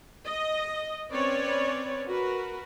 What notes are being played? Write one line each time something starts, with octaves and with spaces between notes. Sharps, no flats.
D#5
C4 C#4 B4 C#5 D5
F#4 A#4 B4